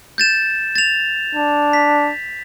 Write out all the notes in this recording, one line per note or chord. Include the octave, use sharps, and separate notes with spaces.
G6 A6 E7
A6 F7
D4
B6